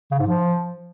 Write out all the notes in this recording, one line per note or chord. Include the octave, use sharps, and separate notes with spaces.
C#3
G#2
F3